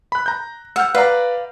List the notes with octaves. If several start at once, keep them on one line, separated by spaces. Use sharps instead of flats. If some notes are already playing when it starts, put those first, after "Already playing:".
B5 F#6
A#5 G6
F#5 E6 F6 G6
B4 D5 F5 A#5